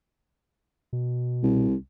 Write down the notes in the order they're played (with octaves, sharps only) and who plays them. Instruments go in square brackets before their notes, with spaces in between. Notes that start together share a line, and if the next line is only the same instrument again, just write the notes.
[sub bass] B2
[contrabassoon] C2